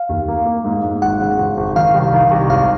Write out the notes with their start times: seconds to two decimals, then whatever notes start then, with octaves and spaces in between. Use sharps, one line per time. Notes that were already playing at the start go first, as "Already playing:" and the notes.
Already playing: F5
0.09 D#2
0.28 A#3
0.46 A#3
0.64 G#2
0.84 G#2
1.01 G#1 F#5
1.21 C#3
1.39 G#1
1.57 G#1
1.76 D#3 F5
1.94 C2
2.13 D#3
2.31 C2
2.49 G#1 F5